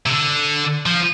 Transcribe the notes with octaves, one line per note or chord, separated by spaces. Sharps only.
C3
D3
F3